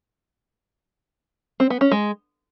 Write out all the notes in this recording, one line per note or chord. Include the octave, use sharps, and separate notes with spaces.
C4
B3
C#4
G#3